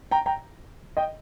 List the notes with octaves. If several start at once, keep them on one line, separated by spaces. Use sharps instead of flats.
G5 A#5
G5 A#5
D#5 G5